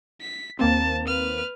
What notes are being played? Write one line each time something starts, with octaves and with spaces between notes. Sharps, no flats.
B6
D#2 A#3 C4 A5
B4 F6